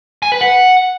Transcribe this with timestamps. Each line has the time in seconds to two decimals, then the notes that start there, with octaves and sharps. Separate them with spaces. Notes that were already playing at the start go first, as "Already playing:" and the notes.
0.23 G#5
0.32 B4
0.41 F#5